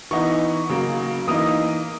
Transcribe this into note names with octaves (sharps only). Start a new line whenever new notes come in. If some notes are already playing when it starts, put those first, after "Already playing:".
E3 B3 D#4 C#6
C#3 F#3 A#3
E3 A#3 D#4 D#6